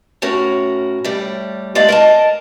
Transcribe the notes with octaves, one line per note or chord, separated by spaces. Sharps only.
A2 C#4 F#4 A#4
A2 G3
G#3 A3 D5 F5
A#4 D#5 A5